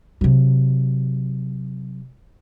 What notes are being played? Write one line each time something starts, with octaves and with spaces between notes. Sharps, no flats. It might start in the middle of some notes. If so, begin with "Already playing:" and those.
C3 F#3